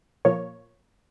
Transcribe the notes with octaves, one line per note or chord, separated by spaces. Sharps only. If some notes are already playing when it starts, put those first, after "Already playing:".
A#2 F3 A#3 C#5